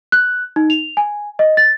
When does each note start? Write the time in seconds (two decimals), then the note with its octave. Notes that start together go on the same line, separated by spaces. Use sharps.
0.12 F#6
0.56 D#4
0.70 F7
0.97 G#5
1.39 D#5
1.57 A6